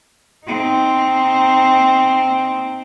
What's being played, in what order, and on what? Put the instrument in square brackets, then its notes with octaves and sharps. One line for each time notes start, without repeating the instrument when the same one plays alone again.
[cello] C4 D#4